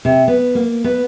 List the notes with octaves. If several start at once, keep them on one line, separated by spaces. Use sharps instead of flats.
C3
B3
A#3
B3